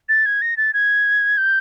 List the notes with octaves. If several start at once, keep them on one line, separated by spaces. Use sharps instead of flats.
A6
G#6
A#6
A6
G#6
G6